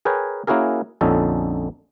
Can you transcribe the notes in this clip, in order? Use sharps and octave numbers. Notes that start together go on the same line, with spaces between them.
G#4 A#4 B4 C#5 G5 G#5
A#3 C#4 E4 F#4 G#4 A#4
A#1 F2 D3 C#4 D#4 A4